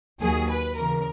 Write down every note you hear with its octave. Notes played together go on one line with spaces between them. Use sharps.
D#2 D#3 F#3 G#4
B4
E2 C#3 E3 A#4